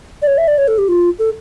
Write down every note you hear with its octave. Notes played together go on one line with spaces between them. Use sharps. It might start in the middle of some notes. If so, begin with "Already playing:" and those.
D5
C#5
E5
D5
C#5
A4
G4
F4
A4